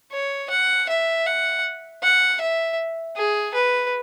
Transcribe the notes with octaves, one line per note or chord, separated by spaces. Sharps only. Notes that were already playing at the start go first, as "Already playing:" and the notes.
C#5
F#5
E5
F#5
F#5
E5
G#4
B4